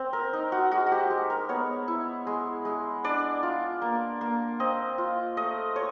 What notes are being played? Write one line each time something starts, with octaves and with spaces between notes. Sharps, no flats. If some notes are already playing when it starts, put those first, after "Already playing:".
Already playing: C4
A#4
D#4
F#4
G#3 F#4
F#4
G4
G#3
A#4
B3 C#5
E4
G#3
G#3
D4 D5
F4
A#3
A#3
C4 D#5
F4
A3 D#5
A3 C#5